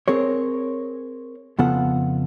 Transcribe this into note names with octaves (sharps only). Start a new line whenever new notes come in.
C4 G#4 A#4 C#5
F2 C#3 B3 F4 A4 F#5